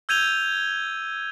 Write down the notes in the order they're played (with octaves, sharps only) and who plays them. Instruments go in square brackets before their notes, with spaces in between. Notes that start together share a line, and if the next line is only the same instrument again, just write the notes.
[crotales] E6 G6 G#6 D#7 F7 G7